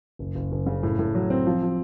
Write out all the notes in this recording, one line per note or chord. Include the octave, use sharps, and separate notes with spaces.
F#1
F#1
F#1
C#3
A2
A2
F#3
C4
F3
F3